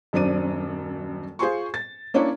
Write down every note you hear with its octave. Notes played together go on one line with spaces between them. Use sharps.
D#1 F#2 C4 D4 D5 D#7
F4 G#4 C5 G#5 C6 C#6
A6
A#3 C#4 D4 E4 C#5